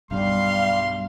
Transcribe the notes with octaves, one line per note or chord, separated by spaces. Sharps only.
B1 G2 G3 F5 C6